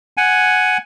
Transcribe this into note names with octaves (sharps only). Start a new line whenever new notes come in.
F#5 G#5